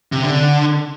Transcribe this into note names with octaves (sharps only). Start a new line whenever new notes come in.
C3
D3